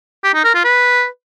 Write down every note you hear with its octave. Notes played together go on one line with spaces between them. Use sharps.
G4
D#4
A#4
F4
B4